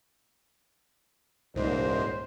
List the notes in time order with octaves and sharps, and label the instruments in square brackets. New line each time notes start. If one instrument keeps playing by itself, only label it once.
[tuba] D#1 [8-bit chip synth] C2 G#2 [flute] C5